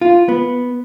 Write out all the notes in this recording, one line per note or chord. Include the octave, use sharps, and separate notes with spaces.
F4
B3